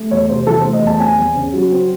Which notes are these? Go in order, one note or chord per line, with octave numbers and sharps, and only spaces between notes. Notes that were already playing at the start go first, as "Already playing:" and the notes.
Already playing: A3
E2 C#5
C3 C5
E3 A4
C5
A3
D#5
E2 A5
C4 G#5
E2
C#3
F#3
C4